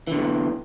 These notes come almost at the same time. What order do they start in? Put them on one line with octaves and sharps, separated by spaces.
E3 D3 E2